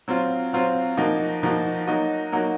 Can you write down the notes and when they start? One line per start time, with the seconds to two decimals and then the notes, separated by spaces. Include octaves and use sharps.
0.08 F#3 C4 F4
0.53 F#3 C4 F4
0.97 F3 A#3 D#4 F#4
1.43 F3 A#3 D#4 F#4
1.87 F#3 A#3 D#4 F#4
2.32 F#3 A#3 D#4 F#4